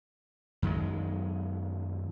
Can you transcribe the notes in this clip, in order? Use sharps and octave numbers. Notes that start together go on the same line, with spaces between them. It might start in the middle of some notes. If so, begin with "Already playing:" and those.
F#2 D#3 F#3 G#3